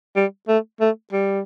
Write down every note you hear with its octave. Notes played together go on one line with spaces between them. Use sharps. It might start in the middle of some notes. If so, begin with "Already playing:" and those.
G3
A3
A3
G3